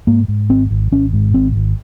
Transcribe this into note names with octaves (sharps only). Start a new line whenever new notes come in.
G#2 A#3
G#2
G#1 C4
G#1
G#1 C#4
G#2
G#1 C4
G#1